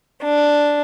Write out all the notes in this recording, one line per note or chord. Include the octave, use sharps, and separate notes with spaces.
D4